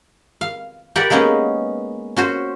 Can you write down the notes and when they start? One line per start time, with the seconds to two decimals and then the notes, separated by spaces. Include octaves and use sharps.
0.41 F5
0.96 G4 A#4 B4 D5 F#5
1.10 G#3 A#3 B3 C#4 D#4
2.16 C#4 F#4 C5